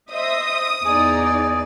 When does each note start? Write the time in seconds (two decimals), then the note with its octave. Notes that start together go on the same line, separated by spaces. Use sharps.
0.11 C5 D#5 E5 D#6
0.85 E2 D#4 G#4 D5